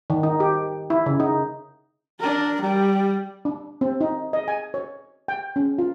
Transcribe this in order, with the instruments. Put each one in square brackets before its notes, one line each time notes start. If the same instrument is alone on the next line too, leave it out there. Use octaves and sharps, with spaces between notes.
[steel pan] D#3
D#4
G4
E4
C#3
D#4
[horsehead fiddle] D4 A#4
G3
[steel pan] D4
C4
D#4
D#5
G#5
C#5
G5
C#4
F4